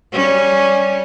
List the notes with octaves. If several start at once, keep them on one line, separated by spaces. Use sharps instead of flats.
G3 C#4